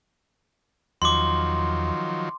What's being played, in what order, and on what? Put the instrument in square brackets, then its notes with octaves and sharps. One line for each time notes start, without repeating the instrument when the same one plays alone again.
[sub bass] E2 [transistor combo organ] D#3 F3 F#3 [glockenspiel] C6 D6